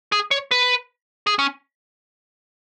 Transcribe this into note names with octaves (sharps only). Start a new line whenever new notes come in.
G#4
C#5
B4
G#4
C#4